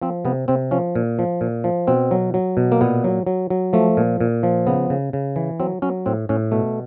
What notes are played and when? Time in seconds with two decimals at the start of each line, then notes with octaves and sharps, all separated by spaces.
0.02 F3 C4
0.25 C3 B3
0.48 C3 C4
0.71 F3 C#4
0.96 A#2
1.19 F3
1.41 A#2
1.64 F3
1.87 B2 C4
2.11 F#3
2.34 F#3
2.57 B2
2.72 A#3
2.81 A#2 B3
3.04 F#3
3.27 F#3
3.50 F#3
3.73 F3 A3
3.97 A#2
4.21 A#2
4.43 F3
4.67 C#3 B3
4.90 C#3
5.13 C#3
5.36 E3
5.60 F#3 C4
5.82 F#3 C#4
6.06 A2 C4
6.29 A2 C#4
6.52 B2 A3